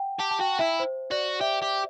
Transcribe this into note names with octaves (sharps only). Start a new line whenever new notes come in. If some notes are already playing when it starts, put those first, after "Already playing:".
Already playing: F#5 G5
G4 A5
A5
F#4 G5
E4 E5
C5
F#4 D5
G4 E5
G4